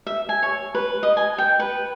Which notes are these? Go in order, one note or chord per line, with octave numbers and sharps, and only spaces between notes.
E5
G#5
C#5
B4
D#5
G#5
G5
B4